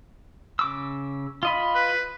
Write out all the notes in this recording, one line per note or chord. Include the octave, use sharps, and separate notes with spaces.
C#3 D6 E6
F4 D#5 B5
B4